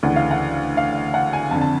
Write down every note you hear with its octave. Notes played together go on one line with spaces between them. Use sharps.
D2 C#3 E3 F#5
F5
F#5
F5
F#5
G#5
F2 D3 A5
A5